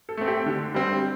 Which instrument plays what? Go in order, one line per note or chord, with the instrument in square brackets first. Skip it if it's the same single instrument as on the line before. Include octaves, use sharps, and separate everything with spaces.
[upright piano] A4
A3 C4
G4
D3
G3 C4